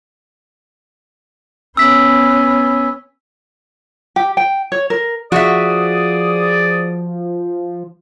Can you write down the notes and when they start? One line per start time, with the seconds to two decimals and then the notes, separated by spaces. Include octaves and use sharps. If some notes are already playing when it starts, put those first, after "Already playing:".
1.77 B3 C#4 E6 B6
4.16 G4
4.37 G5
4.72 C#5
4.90 A#4
5.32 F3 F#4 G#4 D5 E5 D#6